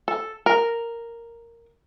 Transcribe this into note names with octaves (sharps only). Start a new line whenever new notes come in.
A4
A#4